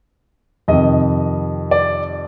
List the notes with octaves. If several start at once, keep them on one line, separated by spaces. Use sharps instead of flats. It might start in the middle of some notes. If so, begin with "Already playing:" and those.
F2 C3 D#3 D#5
D5